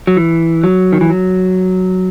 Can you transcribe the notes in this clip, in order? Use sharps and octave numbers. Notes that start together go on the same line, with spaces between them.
F#3
E3
F#3
D#3
E3
F#3